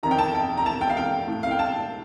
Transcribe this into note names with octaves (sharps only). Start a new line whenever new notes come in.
F2 D#3 A#5
G5
A5
G5
A#5
A5
G5
F5
G5
A2
F5
G5
A5